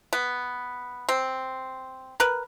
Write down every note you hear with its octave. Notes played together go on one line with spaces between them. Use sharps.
B3
C4
A#4 B4